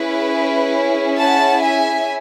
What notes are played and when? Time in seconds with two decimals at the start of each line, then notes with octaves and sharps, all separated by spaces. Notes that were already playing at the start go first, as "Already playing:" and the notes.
Already playing: C#4 E4 G#4 B4
1.19 F#5 A5
1.61 E5 G#5